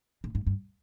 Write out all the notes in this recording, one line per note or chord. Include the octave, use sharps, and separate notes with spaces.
A2
G#2
G2